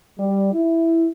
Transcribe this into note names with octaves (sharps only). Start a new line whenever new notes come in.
G3
E4